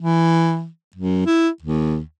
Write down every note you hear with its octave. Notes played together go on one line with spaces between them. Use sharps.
E3
F#2
E4
D#2